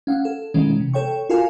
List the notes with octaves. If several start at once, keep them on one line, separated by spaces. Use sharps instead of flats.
C#4 F5 F#5
A4
B2 D#3 E3 G#3 C#4
C3
A4 C#5 G5 C#6
F4 F#4 A4 A#4 F5 G#5